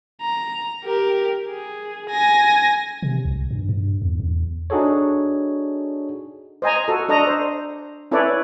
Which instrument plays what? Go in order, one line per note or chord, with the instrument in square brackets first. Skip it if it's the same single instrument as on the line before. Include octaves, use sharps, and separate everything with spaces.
[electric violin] A#5
G4 A#4
G#4
G#5 A#6
[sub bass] C3
C2
G2
G2
E2
E2
[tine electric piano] D4 D#4 F#4 G#4 A4 C#5
[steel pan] C5 D#5 G#5 A#5
F#4 A4
D4 A4 D#5 A#5
C5
C#4 E4 A4 B4 C#5 D5